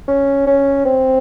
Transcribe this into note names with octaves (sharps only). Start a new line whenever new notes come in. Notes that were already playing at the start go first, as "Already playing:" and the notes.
C#4
C#4
C4